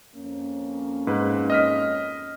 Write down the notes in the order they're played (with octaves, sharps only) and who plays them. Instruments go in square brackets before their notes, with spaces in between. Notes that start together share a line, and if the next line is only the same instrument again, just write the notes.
[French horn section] F2 A#3 C#4
[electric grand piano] G#2 B4
D#5 F6 B6